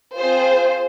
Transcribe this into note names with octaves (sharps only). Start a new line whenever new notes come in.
C4 F4 G#4 C5